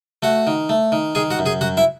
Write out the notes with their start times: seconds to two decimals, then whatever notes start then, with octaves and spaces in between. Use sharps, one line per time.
0.23 A3 F#4 F#5
0.47 D#3
0.69 A3
0.92 D#3
1.15 D#3 G#4 G#5
1.30 F#4 F#5
1.39 F#2
1.46 G#4 G#5
1.61 F#2 F#4 F#5
1.77 E4 E5